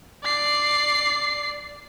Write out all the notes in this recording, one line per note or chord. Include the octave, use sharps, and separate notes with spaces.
D5 C7